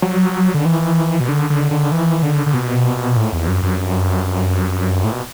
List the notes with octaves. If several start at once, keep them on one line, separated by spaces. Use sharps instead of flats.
F#3
D3
E3
B2
D3
D3
D3
E3
D3
D3
B2
A2
E2
F#2
F#2
A2
B2